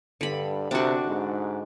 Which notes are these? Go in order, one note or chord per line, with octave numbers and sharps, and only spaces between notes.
G2 D3 B5
C3 D4 F#4
G#2